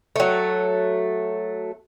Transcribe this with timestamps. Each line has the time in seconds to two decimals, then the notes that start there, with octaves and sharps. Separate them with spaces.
0.16 F#3 A3